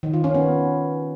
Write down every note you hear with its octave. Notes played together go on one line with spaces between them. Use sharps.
D#3
F4
C#4
B3